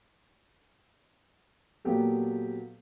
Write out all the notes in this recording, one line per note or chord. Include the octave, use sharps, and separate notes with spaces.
A#2 F#3 B3 G4 A4